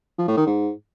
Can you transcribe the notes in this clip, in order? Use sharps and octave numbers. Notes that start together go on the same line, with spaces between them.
F3
A2
D#3
G#2